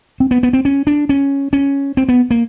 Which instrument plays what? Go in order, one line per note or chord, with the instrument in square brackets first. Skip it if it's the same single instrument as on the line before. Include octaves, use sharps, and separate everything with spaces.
[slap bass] C4
B3
B3
C4
C#4
D4
C#4
C#4
C4
B3
A#3